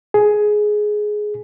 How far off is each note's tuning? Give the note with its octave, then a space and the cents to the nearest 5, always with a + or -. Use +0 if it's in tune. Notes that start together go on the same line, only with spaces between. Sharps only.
G#4 +10